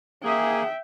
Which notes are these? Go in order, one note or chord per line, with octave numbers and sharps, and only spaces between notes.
A#3 G#4 E5 G5